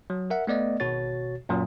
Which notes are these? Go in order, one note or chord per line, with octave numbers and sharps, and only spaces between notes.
F#3
A#4 E5 F#5
A3 B3 D5 D#5
G#1 B2 F#4 C#5 A6
F#2 A#2 F#3